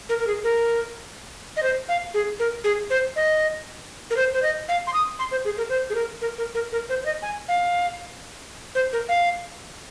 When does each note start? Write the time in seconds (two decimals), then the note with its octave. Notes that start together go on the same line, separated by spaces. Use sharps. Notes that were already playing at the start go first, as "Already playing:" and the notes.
0.09 A#4
0.19 A#4
0.27 G#4
0.44 A#4
1.57 D#5
1.63 C5
1.89 F5
2.14 G#4
2.39 A#4
2.64 G#4
2.90 C5
3.16 D#5
4.10 A#4
4.17 C5
4.33 C5
4.43 D#5
4.68 F5
4.87 C6
4.94 D#6
5.19 C6
5.31 C5
5.45 G#4
5.57 A#4
5.69 C5
5.90 G#4
5.95 A#4
6.21 A#4
6.38 A#4
6.55 A#4
6.72 A#4
6.89 C5
7.02 C5
7.05 D#5
7.22 G#5
7.48 F5
8.75 C5
8.93 A#4
9.09 F5